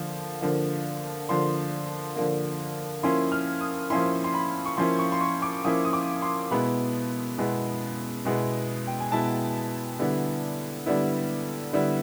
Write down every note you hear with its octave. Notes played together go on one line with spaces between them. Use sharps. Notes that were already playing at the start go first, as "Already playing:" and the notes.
Already playing: D3 F3 A#3
D3 F3 A#3
D3 F3 A#3 C6
D3 F3 A#3
F3 A#3 C#4 E4 C6
F6
D#6
F3 A#3 C#4 E4 C6
C6
B5
C#6
F3 A#3 C#4 E4 C6
C#6
C6
C#6
D6
F3 A#3 C#4 E4 D#6
D#6
D6
C6
B2 G#3 B3 E4 B5
B2 G#3 B3 E4
B2 G#3 B3 E4
G5
G#5
B2 G#3 B3 E4 A5
D3 G3 B3 E4
D3 G3 B3 E4
D3 G3 B3 E4